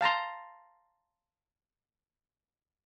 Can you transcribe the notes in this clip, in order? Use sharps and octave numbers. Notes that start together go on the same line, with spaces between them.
F5 A5 A#5 C6